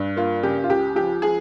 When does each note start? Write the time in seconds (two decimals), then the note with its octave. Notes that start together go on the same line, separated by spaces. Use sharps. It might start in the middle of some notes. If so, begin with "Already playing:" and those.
Already playing: G2
0.16 A#3 F4
0.43 C#3 G4
0.64 F4
0.69 C#2 G4
0.95 F3 G4
1.22 F3 G#4